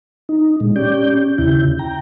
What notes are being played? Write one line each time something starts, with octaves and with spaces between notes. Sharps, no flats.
D#4
A#2 G#3
C#4 G4 D5 G6
D#2 C#3 E4 G6
G5 A#5